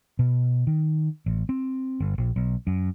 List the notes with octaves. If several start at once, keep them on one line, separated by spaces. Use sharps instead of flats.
B2
D#3
A1
C4
G1
A#1
B1
F#2